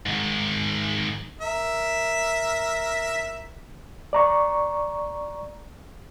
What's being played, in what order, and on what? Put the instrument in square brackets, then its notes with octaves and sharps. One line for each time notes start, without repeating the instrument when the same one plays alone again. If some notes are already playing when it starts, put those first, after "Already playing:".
[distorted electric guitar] G#2 D#3
[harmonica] A#4 E5
[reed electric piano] D5 A#5 C#6